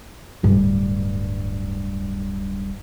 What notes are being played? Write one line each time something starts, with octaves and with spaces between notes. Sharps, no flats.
D1 G2